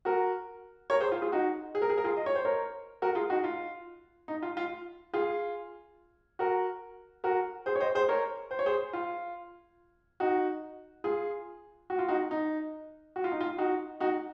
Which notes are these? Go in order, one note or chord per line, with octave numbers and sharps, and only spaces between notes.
F#4 A#4
A#4 C#5
G#4 C5
F4
F4 G#4
D#4 F#4
G#4
A#4
G#4
A#4
F4 G#4
D#5
C#5
C5
A#4 C#5
F#4 A#4
F4 G#4
D#4 F#4
F4
D#4
F4
F4
F4 G#4
F#4 A#4
F#4 A#4
G#4 C5
C#5
C5 D#5
G#4 C5
A#4 C#5
C5
C#5
G#4 C5
F4
D#4 F#4
F4 G#4
F#4
F4
D#4 F#4
D#4
F#4
F4
D#4
F4
D#4 F#4
D#4 F#4